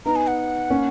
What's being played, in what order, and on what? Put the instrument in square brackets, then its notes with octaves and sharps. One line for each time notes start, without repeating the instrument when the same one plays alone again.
[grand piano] B3 D#4 [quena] A#5
[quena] G#5
F#5
[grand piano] A#3 C#4